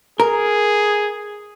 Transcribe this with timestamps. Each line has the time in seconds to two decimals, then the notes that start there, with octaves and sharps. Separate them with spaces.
0.20 G#4 A#4